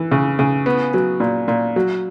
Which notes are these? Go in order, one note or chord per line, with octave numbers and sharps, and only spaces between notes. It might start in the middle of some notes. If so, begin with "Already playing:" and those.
Already playing: E3
C#3
C#3
B3
F#3
A#2
A#2
F#3